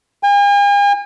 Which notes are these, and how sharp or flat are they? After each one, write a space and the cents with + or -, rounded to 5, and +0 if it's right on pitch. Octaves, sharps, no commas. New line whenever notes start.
G#5 -45